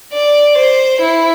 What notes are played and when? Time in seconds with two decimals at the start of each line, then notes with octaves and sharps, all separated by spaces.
0.13 D5
0.57 C5
1.01 E4